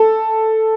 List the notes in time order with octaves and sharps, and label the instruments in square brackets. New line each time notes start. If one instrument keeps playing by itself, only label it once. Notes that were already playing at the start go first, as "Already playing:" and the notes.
Already playing: [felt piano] A4